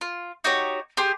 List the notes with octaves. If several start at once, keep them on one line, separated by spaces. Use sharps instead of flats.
F4
D#4 F#4 G4 C#5
G4 G#4 C6